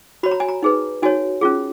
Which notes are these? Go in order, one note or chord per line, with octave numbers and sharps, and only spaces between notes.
F#4 C#5 B5
A#5
G#5
A#5
D#4 G#4 B4
D#4 F#4 C#5 G#5
C#4 F4 G#4